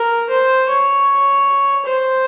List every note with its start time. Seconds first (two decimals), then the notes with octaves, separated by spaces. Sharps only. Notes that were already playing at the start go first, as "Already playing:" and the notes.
Already playing: A#4
0.29 C5
0.69 C#5
1.85 C5